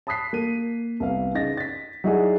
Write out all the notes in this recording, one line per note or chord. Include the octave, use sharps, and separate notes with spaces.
A5 B5 D#6 F#6 B6 C7
A#3 D#7
C2 B3 F5
C#3 D#4 A6 A#6
A6 B6
F#3 D#4 E4 F#4 G#4 D5